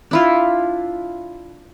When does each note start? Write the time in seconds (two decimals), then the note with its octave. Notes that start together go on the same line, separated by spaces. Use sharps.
0.11 D4 E4 F4